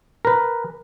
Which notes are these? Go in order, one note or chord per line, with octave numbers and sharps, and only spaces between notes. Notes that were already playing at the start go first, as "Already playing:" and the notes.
A#4 B4